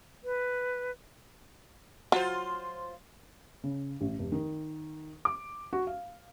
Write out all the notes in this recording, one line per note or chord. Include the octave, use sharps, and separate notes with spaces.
B4
F#3 F4 C5
C#3
A1
F1
D#3
D6
F#4
F5